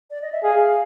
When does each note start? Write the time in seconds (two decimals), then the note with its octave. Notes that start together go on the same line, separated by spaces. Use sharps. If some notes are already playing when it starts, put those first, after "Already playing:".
0.10 D5
0.22 D#5
0.32 E5
0.43 G#4 F5